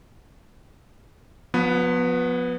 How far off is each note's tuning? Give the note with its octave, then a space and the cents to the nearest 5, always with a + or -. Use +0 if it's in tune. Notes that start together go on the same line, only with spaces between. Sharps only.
F3 +40 B3 +0 B4 +0